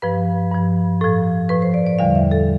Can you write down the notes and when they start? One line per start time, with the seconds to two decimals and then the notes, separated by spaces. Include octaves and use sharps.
0.02 G2 F3 B4
0.52 G2 F3
1.01 A2 F3 A4
1.49 A2 F3 B4
1.62 C5
1.74 D5
1.86 D5
1.99 E2 D3 G3 F5
2.15 E5
2.31 A4